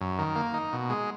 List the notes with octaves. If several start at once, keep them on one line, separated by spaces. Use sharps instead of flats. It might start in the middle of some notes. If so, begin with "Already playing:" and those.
F#2
D#3
A#3
D#4
B2
G#3